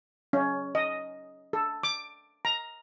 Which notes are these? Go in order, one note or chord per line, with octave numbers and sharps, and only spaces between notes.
C#4
D#5
A4
D6
A#5